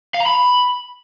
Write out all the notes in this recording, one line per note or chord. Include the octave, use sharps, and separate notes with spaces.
F5
A#5
B5